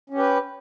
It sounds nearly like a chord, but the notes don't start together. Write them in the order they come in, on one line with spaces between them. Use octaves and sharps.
C#4 G4 B4